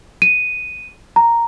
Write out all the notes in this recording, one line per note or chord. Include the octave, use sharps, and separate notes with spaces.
D#7
A#5